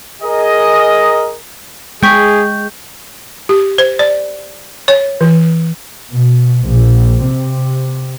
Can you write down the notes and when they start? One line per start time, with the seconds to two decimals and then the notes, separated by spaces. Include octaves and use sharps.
0.23 G#4 A#4 D#5
2.03 G#3 G#4 G5 C#6 G6 B6
3.49 G4
3.78 C5
3.99 D5
4.88 C#5
5.21 E3
6.12 B2
6.64 A#1
7.25 C3